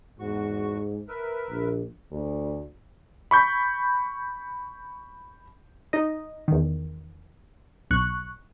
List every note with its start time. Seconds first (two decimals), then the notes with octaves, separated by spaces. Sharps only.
0.20 E2 G#2 F#4 C#6
1.08 A#4 B4 E5
1.50 A#1
2.11 D2
3.31 B5 C#6 G6 B6
5.93 D#4 D#5
6.48 E2 D#3
7.91 B1 C#6 F#6